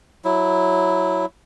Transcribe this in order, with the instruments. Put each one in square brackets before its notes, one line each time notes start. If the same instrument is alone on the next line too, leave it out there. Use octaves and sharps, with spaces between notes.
[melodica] F#3 E4